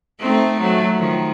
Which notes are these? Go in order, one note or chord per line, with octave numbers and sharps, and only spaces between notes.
A3 C4 D#4
F#3 A3
D#3 F3